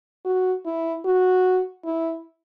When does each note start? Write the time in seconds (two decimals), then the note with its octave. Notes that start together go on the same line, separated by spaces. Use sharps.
0.25 F#4
0.65 E4
1.05 F#4
1.85 E4